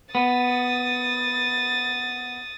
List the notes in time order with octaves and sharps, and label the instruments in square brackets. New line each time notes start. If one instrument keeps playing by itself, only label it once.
[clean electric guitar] B3 [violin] D#6 A6